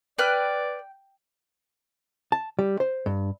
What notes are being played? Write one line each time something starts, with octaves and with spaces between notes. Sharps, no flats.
B4 D5 G5 F6 F#6
A5
G3
C5
G2